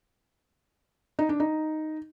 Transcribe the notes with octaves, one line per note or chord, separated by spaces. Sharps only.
D#4
D4
D#4